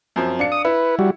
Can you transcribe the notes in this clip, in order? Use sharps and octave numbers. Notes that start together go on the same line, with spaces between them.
F#2 F3 C4
D4 F5 C#7
D#6
E4 B4
G3 F#4